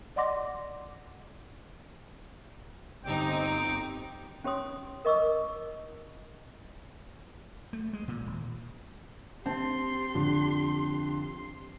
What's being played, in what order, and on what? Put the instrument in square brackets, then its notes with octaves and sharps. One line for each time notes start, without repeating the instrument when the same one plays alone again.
[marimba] D5 D#5 F#5 C6 D6 A#6
[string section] G1 C4 D#4 [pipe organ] G4 G5 D6
[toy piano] C#4 G4 C#5 C6 D#6
A#4 D#5 C#6 D6 E6
[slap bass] A3
G#3
A#2
D#1
[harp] C4 [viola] G4 C6 [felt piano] A5
[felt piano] F2 D3